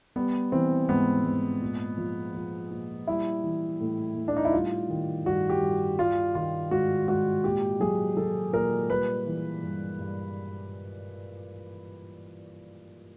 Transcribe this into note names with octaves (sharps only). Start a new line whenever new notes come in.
G3 B3
E3 C4
G#2 B3
G#2
A#2
F3
F3
A#2
G3 E4
E3
A2
A2
D4
D#4
E4
G3 F4
D#3
G2 F#4
G4
G2
G3 F4
D#3 F4
G#2 F#4
G#2 F#4
A#2 G4
F#3 G#4
F#3 A4
A#2 A#4
G3 B4
E3
G2
G2